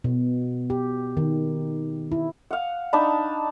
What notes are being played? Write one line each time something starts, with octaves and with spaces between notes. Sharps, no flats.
B2
G4
D#3
E4
F5 F#5
D4 D#4 A5 B5